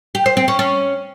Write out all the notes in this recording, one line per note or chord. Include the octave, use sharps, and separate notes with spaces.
G4
C5
C4
C#4
C#4